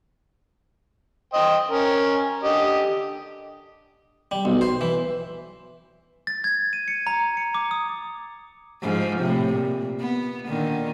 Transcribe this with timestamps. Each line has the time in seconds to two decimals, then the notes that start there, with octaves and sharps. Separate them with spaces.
1.34 C5 D#5 G5
1.71 C#4 A#4
2.44 D3 G4 D#5
4.31 G3
4.45 B1
4.61 C5
4.81 E3
6.27 A6
6.44 G#6
6.73 D#7
6.88 C#7
7.07 A#5
7.37 C#7
7.55 D6
7.71 D#6
8.82 G#2 F3
9.20 A2 C3
9.53 A#2
9.99 B3
10.46 A#2 D3 D#3